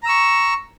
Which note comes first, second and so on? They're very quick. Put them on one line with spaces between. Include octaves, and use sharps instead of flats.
A#5 E6 C#6